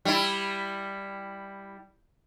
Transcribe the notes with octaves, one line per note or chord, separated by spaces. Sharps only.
G3 E4